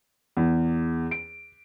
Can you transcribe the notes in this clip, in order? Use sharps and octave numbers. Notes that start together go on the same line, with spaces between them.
E2
D7